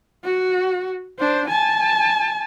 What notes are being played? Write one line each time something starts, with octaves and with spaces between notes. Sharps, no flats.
F#4
D4 C5
G#5 A5